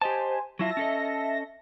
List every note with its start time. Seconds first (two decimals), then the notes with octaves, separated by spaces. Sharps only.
0.02 G4 C5 D#5 G#5 A5
0.59 F#3 E4 F4 E5 A5 A#6
0.77 C#4 A4 D#5